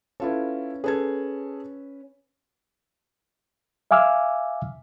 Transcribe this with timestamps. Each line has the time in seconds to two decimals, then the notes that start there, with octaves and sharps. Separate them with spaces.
0.20 C#4 E4 F4 A4 B4
0.84 C#4 G#4 A4 B4 G#6
3.91 E5 F5 G#5 D6 E6 F6